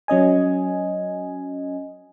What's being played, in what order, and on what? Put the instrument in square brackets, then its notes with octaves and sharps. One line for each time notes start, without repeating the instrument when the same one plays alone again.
[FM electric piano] F#3 C#4 D#5 G#5